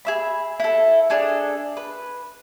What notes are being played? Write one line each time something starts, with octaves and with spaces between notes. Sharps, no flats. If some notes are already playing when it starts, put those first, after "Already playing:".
G#4 E5 B5
E4 A4
D4 G#4 A4
B4